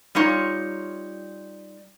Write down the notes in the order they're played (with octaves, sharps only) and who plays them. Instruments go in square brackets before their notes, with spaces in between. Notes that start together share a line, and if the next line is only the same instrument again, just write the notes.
[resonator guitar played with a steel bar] G3 D#4 F4 C#5